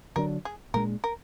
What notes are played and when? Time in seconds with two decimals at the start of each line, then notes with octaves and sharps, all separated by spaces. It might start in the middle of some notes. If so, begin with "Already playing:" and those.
0.16 D3 F#3 D4 A#4
0.45 G#4
0.74 A#2 G#3 D4 A#4
1.04 A#4